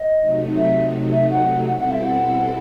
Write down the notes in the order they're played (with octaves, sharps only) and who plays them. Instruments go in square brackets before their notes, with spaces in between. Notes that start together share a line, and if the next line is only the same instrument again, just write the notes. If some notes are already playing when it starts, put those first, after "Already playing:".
Already playing: [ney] D#5
[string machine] C3 F#3 A3 D#4
[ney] E5
E5
F#5
[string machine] B2 G3 C4 E4 A4 [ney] F#5
[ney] F#5
E5
F#5